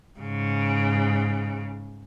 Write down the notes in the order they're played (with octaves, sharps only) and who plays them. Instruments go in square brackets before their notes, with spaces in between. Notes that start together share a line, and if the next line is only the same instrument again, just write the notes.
[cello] G#2 C#3